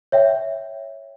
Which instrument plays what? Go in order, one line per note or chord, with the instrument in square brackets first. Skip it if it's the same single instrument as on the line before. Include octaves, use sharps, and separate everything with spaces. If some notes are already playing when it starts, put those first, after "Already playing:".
[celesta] C#5 E5 G5